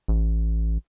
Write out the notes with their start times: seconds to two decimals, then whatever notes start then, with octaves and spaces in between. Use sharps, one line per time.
0.08 A1